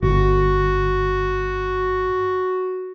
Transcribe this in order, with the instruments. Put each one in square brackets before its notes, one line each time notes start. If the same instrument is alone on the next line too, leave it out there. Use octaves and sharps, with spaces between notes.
[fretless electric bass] G1 [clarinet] F#4